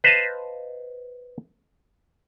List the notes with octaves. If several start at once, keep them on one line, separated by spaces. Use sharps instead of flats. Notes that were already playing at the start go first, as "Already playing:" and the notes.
B4 C5 D#5 F5 A5